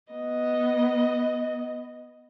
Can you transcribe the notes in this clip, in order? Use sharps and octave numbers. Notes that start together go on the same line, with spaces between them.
B3 D#5